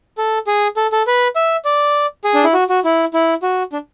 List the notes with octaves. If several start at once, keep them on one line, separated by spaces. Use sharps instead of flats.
A4
G#4
A4
A4
B4
E5
D5
G#4
D4
E4
F#4
F#4
E4
E4
F#4
D4